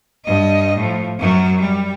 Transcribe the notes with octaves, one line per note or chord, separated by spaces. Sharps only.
G2 D#5
A2 F3
F#2 F#3
G3